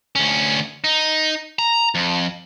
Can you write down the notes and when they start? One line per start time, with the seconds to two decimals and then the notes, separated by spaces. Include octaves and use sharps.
0.16 D2 C#4
0.84 D#4
1.59 A#5
1.95 F2